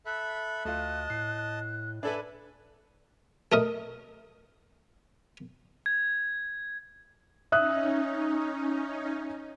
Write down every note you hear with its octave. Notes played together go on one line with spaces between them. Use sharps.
A4 E5 B5 F#6
D2 A3 F4 D#5 A5
A2 C7
D4 A4 B4 E5 G#5 B5
A3 A#4 D#5
G#6
C#4 D#4 E5 D#6 F#6